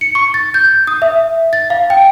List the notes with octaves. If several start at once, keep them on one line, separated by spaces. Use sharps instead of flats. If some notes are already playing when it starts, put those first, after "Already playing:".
C#7
C#6
A6
G6
D#6
E5
A6
F5
G5